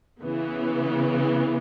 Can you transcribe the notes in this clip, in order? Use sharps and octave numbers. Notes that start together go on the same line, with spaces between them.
C#3 E3 B3